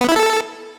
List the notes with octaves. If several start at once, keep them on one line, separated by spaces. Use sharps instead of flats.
B3
E4
A4